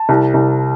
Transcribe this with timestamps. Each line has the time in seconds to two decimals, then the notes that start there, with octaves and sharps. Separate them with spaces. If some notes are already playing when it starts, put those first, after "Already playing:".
Already playing: A5
0.09 C2
0.34 C2